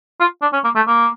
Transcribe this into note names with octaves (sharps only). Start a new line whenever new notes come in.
F4
D4
C#4
A#3
A3
A#3